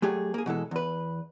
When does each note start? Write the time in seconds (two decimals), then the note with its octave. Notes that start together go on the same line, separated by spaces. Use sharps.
0.02 F#3 A3 G4 G#4
0.34 A#3 G#4
0.46 B2 E3 G#3 A4
0.71 E2 B4